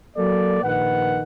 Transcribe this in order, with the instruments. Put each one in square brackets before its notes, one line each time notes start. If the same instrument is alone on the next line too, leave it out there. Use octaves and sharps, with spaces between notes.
[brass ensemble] F#3 A#3 A4 D5
A#1 D#3 B4 F#5